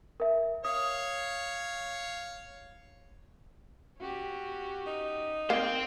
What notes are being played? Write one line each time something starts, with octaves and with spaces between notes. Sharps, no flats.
A#4 E5
C#5 F5 D#6
C#4 F#4 G4
D#4
A#3 C4 C5 G5